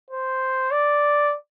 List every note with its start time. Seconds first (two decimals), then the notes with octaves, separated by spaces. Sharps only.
0.10 C5
0.71 D5